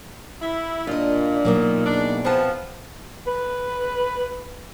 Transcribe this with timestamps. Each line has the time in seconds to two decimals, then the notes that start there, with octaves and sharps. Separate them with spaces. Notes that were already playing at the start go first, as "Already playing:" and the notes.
0.41 E4
0.87 A#2 D4 F4 D#5
1.45 B2 F#3 A#3 D#4
1.86 E2 D4
2.25 F3 B3 C4 A5
3.27 B4